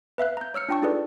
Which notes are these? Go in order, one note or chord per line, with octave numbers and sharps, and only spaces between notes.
B4 E5 F5 F#6
A#5 G6
C#5 E6 F6 C#7
D4 F4 G5 A5 C#6
D#4 F4 G#4 A4 B4 D5